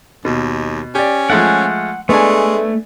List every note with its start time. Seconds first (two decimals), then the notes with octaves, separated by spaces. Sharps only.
0.25 D#2 B2
0.95 C#4 G4 D5
1.30 F3 G#3 A3 F#5
2.09 G#3 A3 B3 D4 G#5